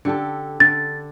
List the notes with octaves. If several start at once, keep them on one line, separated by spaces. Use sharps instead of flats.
D3 G4 A4
D3 A6